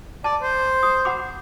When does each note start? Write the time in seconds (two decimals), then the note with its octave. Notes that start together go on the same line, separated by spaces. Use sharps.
0.24 D5 A5
0.42 C5
0.83 D#6
1.05 F#5 B5 D6